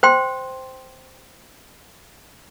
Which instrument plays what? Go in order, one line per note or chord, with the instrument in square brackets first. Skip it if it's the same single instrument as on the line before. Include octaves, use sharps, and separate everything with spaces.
[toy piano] C5 G5 C6